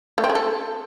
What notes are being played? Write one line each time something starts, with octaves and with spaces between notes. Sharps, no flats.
A3
C4
G#4
A4